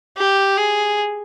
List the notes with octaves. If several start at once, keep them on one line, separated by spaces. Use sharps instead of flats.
G4
G#4